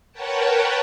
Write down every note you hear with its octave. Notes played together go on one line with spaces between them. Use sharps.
A#4 B4 C#5 F#5 G5 A5